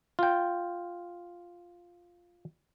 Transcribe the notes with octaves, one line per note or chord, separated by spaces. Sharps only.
F4 G5